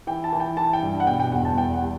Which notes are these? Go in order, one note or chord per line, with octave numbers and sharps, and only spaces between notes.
E3 G5
A5
E3
G5
E3 A5
G5
G2
F#5
B2 G5
G5
E2 F#5
A5
E2 G5
F#5
G3